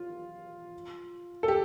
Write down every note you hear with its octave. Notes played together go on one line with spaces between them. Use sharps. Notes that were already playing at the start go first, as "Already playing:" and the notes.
Already playing: F4
A4
G4